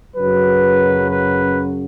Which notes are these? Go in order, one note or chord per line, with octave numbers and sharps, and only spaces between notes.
F#2 C#3 F#3 B4
B4